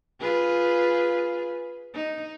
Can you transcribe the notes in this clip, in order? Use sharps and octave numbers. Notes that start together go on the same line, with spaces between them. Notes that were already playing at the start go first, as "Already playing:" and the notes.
F4 G#4 B4
D#4